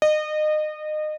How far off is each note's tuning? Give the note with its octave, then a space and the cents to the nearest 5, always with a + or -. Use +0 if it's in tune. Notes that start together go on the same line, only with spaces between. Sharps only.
D#5 -30